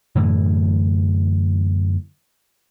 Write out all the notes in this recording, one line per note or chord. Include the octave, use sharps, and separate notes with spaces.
F#2 A2 D3 E3